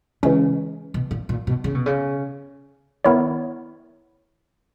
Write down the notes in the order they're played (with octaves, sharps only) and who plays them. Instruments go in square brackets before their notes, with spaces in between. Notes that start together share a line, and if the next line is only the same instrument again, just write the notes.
[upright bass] C#3 [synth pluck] E3 G#3 C#4
[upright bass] B2
A#2
A#2
B2
C#3
B2
C#3
[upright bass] D#3 [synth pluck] B3 E4 A#4 C#5